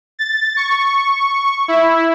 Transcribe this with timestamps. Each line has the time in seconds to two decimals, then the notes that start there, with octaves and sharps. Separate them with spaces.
0.19 A6
0.57 C#6
1.68 E4